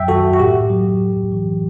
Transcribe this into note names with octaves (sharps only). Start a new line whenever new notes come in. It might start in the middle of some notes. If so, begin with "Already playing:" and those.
Already playing: F#2 F#3 E5 G5
D#3 F#4 A4
F#4
A2 G4
F#3
A2
E3